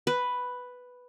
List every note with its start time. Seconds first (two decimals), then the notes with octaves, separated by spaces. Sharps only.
0.07 B4